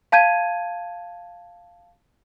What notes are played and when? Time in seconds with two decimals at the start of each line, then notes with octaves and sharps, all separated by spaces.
0.12 F5 A5 G6 G#6 D#7